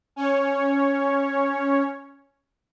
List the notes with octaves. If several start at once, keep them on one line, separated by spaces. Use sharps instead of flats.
C#4 C#5